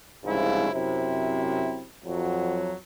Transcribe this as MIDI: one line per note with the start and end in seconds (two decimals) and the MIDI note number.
0.25 0.72 36
0.25 0.72 44
0.25 0.72 49
0.25 0.72 53
0.25 0.72 64
0.72 1.86 42
0.72 1.86 48
0.72 1.86 60
0.72 1.86 64
2.04 2.74 41
2.04 2.74 54